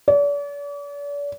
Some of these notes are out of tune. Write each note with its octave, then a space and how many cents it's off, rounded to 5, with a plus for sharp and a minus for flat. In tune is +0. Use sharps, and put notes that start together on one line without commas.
D5 -40